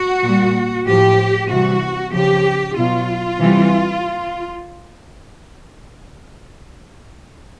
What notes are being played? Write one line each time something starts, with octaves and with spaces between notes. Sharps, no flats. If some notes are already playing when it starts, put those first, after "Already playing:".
Already playing: F#4
A#2 G3
A2 F3 G4
C3 E3 G3 F#4
C#3 F3 G4
B2 F#3 F4
C3 E3 G3